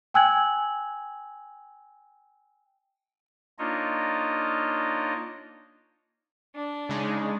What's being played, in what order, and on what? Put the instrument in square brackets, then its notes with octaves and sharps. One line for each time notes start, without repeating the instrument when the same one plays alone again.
[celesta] G5 G#5 E6 F#6 G#6 F#7
[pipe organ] A#3 D4 D#4 F4 C#5 D#5
[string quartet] D4
[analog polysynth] C#3 G#3 D#4